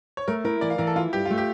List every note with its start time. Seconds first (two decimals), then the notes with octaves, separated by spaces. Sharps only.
0.17 C#5
0.28 A3 A#4
0.44 E4 A#4
0.61 E3 D5
0.70 F5
0.78 E3 A#4
0.87 A4
0.96 E4 F4
1.13 G2 G4
1.25 A3 F4
1.38 G4